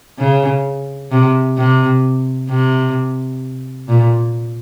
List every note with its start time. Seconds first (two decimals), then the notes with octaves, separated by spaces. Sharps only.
0.19 C#3
1.11 C3
1.57 C3
2.50 C3
3.89 A#2